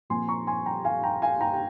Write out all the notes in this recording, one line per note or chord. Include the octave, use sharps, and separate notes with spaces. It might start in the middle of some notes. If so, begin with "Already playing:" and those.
A#2 F3 C4 G#5 C6
A#5 C#6
G#5 C6
G5 A#5
F5 G#5
G5 A#5
F5 G#5
G5 A#5
G5